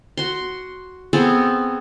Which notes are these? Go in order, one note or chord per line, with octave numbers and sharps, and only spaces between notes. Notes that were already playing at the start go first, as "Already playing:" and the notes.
F#4 C6
B3 C4 G#4 A4